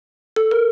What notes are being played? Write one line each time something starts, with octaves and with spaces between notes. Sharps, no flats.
A4
A#4